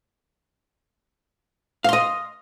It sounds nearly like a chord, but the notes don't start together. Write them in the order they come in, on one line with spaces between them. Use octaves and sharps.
F5 C6 D#5